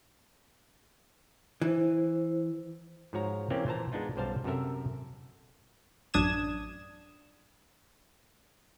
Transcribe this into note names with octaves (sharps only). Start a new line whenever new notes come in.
E3 E4 C5
G#2 F3 F#4 C#5 A#5
E3 A#3 C4 C#4 E4 G4
A#2 E3 C5 A5 A#5
G#3 B3 D4 D#4 F4
B1 F#2 G3 C5 F5 A5
F#2 C3 C4 A4 A#4 E5
A1 F#2 D4 D#6 G#6 E7